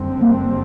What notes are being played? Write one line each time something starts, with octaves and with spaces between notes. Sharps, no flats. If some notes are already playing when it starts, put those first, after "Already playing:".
Already playing: F#1 F#2 D3 G3 C4
A#3